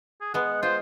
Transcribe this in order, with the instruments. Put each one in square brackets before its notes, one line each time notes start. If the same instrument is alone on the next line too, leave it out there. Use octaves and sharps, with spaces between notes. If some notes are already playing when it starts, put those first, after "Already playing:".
[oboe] G#4
[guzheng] G#3 B3 [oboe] F#5
[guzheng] F4 [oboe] C5